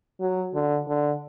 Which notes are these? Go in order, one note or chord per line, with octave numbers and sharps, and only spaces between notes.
F#3
D3
D3